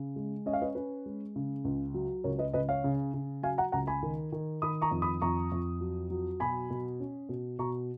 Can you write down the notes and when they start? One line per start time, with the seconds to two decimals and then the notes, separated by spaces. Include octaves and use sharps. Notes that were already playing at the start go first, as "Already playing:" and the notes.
Already playing: C#3
0.16 G#3
0.46 C#4 D#5
0.53 F5
0.62 B4 D#5
0.75 C#4 B4
1.06 G#3
1.36 C#3
1.65 C#2
1.94 F#3
2.24 C#2 A#4 C#5
2.39 B4 D#5
2.53 C#2 B4 D#5
2.69 C#5 F5
2.84 C#3
3.14 C#3
3.43 F#3 F5 G#5
3.58 F#5 A#5
3.72 C#2 F#5 A#5
3.87 G#5 B5
4.03 D#3
4.32 D#3
4.62 D#3 B5 D#6
4.82 A#5 C#6
4.91 F2
5.02 B5 D#6
5.21 F2 A#5 C#6
5.52 F2
5.81 F#3
6.10 F#3
6.40 B2 G#5 B5
6.70 B2
7.00 C#4
7.29 B2
7.59 B2 A#5 C#6